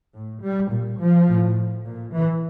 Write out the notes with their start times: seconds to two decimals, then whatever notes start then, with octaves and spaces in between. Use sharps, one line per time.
0.14 A2
0.42 G3
0.71 A#2
0.99 F3
1.28 A2
1.85 A#2
2.12 E3